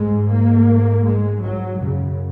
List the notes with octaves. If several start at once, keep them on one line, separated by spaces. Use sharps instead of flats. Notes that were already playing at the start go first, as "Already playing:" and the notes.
Already playing: G#2 G#3
A#3
G#3
F#3
F#2 C#3